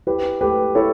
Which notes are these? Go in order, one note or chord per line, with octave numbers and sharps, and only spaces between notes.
E4 G4 B4
A3 G4 B4
E4 A4 C#5